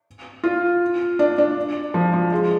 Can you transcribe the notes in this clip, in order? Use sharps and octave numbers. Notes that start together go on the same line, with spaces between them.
F4
D4
D4
F3
F3
G#3